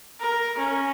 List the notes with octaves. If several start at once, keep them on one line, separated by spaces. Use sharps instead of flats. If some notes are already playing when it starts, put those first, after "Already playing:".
A#4
C#4